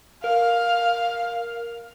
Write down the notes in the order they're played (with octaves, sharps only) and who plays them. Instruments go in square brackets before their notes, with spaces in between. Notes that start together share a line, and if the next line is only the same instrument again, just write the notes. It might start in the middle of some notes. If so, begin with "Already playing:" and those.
[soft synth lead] A#4 [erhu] F5